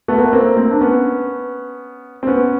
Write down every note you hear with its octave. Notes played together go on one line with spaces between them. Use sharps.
A3 B3
A#3
B3
A#3 C4
A#3 C4
D4
B3 C#4
C4
B3 C#4